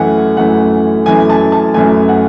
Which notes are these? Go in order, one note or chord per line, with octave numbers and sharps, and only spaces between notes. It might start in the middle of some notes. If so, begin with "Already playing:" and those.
Already playing: F#2 E3 A3 F#5 G#5
F#2 E3 A3 F#5
F#2 E3 A3 G#5
A5
A5
F#2 E3 A3 G#5
F#5